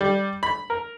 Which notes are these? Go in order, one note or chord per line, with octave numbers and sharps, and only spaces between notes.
G3
B5
A#4